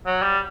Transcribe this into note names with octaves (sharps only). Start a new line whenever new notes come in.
F#3
G3